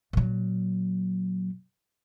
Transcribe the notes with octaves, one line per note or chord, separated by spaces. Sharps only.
A#2 F#3